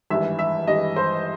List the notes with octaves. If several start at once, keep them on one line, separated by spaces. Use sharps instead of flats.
G#1 G2 E3 E5
E5
G#1 G2 E3 D#5
C5